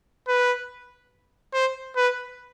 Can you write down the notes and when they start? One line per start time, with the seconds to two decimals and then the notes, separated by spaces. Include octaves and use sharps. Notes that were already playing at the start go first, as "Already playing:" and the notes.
0.28 B4
1.53 C5
1.96 B4